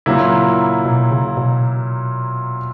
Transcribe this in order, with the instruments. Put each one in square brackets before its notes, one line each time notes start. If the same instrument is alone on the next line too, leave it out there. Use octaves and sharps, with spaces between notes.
[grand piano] A#2 F#3 A#3 E4 [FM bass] C#3
[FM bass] B2
C#3
B2